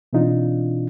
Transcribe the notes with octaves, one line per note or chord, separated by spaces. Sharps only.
B2 E3 C4 D4 D#4 F4